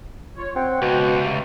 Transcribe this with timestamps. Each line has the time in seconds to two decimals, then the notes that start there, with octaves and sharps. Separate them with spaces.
0.37 F4 C#5
0.56 C4 F#5 G5
0.82 C#2 B2
1.21 C3 A3